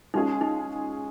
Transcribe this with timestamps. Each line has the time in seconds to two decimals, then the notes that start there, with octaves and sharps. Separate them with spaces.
0.14 G#3 C#4 D#4 F4 G#4
0.41 D#4